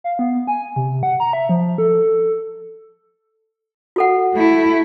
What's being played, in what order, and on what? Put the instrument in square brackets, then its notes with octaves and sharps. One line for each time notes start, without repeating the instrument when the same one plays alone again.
[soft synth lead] F5
B3
G#5
C3
F#5
A#5
E5
F3
A4
[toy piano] F#4 A4 F#5
[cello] A3 E4